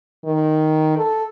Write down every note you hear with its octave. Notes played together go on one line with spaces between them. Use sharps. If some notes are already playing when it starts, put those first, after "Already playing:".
D#3
A4